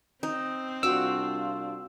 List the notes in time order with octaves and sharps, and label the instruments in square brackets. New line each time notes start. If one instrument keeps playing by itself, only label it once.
[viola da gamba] C4 [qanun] D#4
[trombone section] C2 D4 F4 [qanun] F#4 D6 [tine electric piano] E6